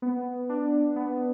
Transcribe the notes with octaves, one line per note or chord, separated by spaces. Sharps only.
B3
D4
B3